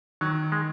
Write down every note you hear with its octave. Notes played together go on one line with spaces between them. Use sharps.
D#3 F#3
G#3